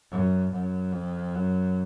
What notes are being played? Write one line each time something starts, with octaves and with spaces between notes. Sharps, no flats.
F#2
F#2
F2
F#2